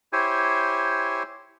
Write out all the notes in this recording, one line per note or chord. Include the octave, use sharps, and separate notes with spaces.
E4 G4 C5 C#5 G#5